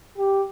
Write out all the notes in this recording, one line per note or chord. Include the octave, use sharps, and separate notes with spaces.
G4